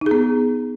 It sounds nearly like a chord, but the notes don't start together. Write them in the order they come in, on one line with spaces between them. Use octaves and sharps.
D#4 G#4 B3